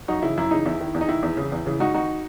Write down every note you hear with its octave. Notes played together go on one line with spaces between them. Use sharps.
F#2 D#4 F#4
C#3 E3 E4
F#2 E4
C#3 E3 D#4
E2 E4
D#3
E2
D#4
D#3 E4
E2
C#3 E3
E2
C#3 E3
G#2 D#4 F#4
D#3 D#4 F#4